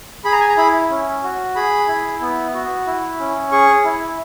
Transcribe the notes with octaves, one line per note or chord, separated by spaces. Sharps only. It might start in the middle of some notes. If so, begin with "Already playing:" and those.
G#4 B5
A#5
G#5
A#5
E4 B5
C#4
F#4
G#4 B5
E4
B3
F#4
E4
C#4
G#4 C#6
E4